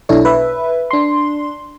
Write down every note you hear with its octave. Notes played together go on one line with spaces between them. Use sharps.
B1 B2 D4 E4 A4 C#5
B4 E5
D4 C6